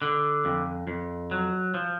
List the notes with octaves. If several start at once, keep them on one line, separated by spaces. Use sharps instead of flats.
D3
F2
F2
F#3
F3